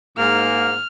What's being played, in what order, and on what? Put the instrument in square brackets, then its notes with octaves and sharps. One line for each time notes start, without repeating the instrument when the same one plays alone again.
[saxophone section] G#2 [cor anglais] A#3 [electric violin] F6